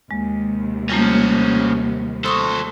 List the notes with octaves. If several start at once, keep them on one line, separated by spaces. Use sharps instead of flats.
D#2 C3 G#3
F3 G3 A3 A#3 C#4
A4 C5 C#6 D#6 E6